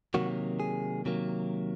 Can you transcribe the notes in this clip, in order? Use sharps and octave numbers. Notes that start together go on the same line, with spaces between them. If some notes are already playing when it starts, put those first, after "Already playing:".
C3 D#3 F#3 A#3 F#4
G#4
C3 D#3 F#3 A#3